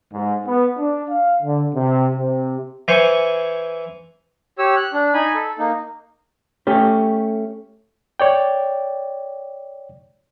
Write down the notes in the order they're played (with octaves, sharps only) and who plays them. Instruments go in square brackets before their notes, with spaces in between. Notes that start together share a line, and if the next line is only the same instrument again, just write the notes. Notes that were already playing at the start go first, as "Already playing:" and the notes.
[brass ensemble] G#2
B3
D4
F5
D3
C3
C3
[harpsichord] E3 C5 G#5 C#6
[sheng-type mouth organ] G4 C#5 E6
F#6
D4
D#4 G#5 B5
A4
A#3 D#4
[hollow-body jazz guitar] A3 C#4 G4
[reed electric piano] C#5 D5 G5